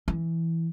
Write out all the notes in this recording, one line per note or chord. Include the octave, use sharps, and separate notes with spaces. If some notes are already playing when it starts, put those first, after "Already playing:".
E3